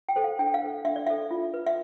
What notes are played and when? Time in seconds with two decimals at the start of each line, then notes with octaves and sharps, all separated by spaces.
0.09 G5
0.16 A4 C5
0.24 F5
0.39 D4 G5
0.54 F5
0.62 A4 C5
0.85 D4 E5
0.96 D5
1.07 A4 C5 E5
1.31 F4
1.54 B4
1.67 E5